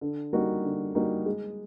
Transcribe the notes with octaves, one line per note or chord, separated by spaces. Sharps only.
D3
G3 A#3 D#4 F#4
D3
G3 A#3 D#4 F#4
G#3